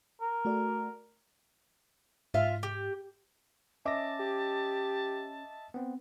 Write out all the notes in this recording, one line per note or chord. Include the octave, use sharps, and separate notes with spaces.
A#4
A3 F#4 D5
G#2 F4 E5 F5
G4
C#4 D#5 E5 A5 D6 A#6
G4
B3 C4